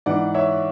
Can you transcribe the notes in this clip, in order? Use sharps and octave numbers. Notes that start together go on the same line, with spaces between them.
G#2 E3 D5 F#5
C#5 E5